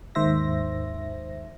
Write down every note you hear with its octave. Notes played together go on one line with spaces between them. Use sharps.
D#2 G#2 D#3 C5 E5 A#6